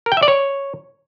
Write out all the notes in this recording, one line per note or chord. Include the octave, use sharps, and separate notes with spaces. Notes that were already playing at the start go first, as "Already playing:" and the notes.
A#4
G5
E5
D5
C#5